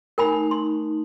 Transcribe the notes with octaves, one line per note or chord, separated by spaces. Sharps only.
A3 D#4 A#4 G#5 B5
C6